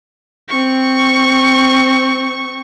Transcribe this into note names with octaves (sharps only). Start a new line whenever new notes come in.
C4 C#6